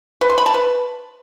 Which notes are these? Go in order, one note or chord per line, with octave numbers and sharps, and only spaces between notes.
B4
C6
B5
A5
B4